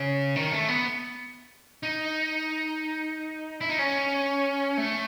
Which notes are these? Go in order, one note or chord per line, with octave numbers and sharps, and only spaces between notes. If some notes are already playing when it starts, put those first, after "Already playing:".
Already playing: C#3
D#3
A3
B3
D#4
E4
D#4
C#4
A3